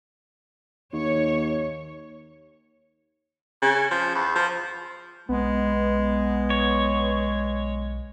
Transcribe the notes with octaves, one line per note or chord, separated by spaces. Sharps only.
D#2 C#5
C#3
F3
E2
F3
B1 G#3 B3
C#5